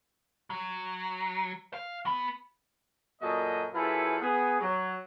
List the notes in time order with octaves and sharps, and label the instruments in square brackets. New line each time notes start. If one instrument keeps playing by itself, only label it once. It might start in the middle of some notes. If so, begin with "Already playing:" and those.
[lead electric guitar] F#3
F5
B3
[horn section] F#2 A#2 F#4 A4 D#5
F#2 E4 F4 G#4 A4 B4
B3 G#4
F#3